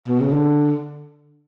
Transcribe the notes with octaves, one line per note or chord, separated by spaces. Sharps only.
B2
C#3
D3